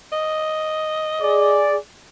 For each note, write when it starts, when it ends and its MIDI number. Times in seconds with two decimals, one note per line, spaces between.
0.12 1.59 75
1.21 1.76 68
1.21 1.76 74